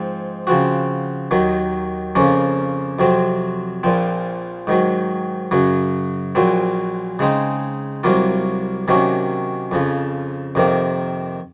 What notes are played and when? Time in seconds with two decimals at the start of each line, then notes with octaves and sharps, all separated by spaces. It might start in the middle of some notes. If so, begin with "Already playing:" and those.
Already playing: G#2 F3 C4
0.47 C#3 F3 C4 F#4
1.31 D#2 D#3 F#3
2.15 F2 C#3 F3 A#3 C#4
2.99 F2 C3 F#3 C4
3.83 A#1 A#2 F3 C4
4.67 G#2 D#3 F#3
5.51 F#2 C#3 F#3
6.35 A#1 A#2 F#3 C4
7.19 C#3 G#3 C4 D#4
8.04 C2 C3 F#3 A#3 F4
8.88 C3 D#3 F#3 A#3 C#4
9.71 F2 C#3 F3
10.55 F2 C3 D#3 A#3